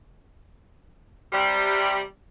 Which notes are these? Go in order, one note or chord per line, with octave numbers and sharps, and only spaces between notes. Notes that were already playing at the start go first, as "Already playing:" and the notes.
C3 G3